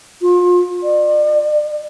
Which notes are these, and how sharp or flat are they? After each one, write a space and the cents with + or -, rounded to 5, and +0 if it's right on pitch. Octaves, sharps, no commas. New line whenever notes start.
F4 +30
D5 +35